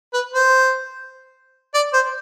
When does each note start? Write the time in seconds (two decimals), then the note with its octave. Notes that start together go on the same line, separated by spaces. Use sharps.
0.14 B4
0.33 C5
1.74 D5
1.93 C5